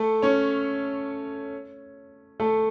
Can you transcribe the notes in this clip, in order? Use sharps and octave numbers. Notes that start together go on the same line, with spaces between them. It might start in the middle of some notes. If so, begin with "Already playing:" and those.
Already playing: A3 A4
C#4 C#5
A3 A4